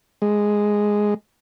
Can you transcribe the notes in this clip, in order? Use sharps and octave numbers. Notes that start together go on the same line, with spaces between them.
G#3